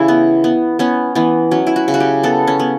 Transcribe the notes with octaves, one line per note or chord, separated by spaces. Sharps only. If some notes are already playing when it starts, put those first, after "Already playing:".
Already playing: C#3 E3 E4 G4
B3
B3
B3 C#4
E3 B3
F#3 C#4
E4
F#4
C#3
F#4
G4
B3 A4
C#4
B3